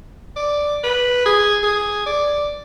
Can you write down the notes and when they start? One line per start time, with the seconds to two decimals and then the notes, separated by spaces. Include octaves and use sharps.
0.37 D5
0.84 B4
1.26 G#4
1.63 G#4
2.06 D5